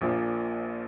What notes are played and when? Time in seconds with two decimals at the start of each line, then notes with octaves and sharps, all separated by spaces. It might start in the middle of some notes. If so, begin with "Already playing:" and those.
0.01 A#1 A#2 F3